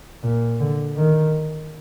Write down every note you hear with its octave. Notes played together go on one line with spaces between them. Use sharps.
A#2
D3
D#3